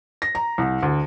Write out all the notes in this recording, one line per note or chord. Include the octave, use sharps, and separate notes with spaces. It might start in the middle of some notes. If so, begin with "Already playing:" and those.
A#6
A#5
C2
D2